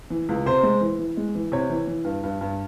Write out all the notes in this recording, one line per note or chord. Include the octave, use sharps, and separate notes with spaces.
E3
C#2
C3 C5
G#3
E3
E3
G#3
E3
C3 C#5
E3
E3
G2
G2
G2